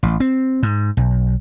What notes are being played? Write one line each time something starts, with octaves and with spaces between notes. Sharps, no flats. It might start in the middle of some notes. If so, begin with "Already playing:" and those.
A1
C4
G#2
B1